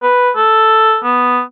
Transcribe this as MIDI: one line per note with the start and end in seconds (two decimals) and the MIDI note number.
0.03 0.31 71
0.36 0.99 69
1.04 1.41 59